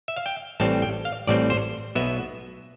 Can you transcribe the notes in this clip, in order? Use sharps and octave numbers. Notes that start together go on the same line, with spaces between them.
E5
F5
G5
A1 A2 G3 C4 A5
G5
F5
A1 A2 G3 C4 D5
C5
B1 B2 B3 E5